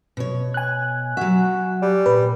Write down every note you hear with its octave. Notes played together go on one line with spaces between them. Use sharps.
B2 C#5
G#5 F#6
F#3 F#4 E5
G3
A#2 B4